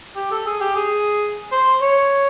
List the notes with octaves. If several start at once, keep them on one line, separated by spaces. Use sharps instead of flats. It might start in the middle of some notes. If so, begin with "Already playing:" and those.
G4
A4
G#4
G4
G#4
C5
C#5